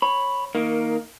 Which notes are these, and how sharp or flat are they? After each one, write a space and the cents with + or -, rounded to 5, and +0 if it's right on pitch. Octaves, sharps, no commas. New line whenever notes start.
C#5 -15 B5 +0
D#3 +15 A#3 +0